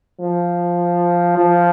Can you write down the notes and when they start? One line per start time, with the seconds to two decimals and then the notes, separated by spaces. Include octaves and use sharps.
0.21 F3
1.38 F3